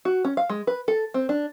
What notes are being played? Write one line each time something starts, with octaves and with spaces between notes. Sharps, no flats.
F#4
C#4
F5
G#3
B4
A4
C4
D4